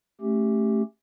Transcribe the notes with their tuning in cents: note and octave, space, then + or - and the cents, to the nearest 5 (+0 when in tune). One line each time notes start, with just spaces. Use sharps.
A3 +0 C#4 -15 G4 +0